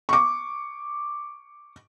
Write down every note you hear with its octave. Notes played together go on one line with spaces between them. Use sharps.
C#6 D6